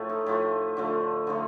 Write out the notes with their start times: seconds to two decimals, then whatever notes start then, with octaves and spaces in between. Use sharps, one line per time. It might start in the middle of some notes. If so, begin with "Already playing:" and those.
Already playing: A2 F3 A3
0.09 D#4
0.26 A2 F3 A3
0.77 D3 F3 A3
1.27 D3 F3 A3 D#4